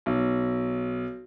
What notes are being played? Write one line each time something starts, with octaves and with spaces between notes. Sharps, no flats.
B1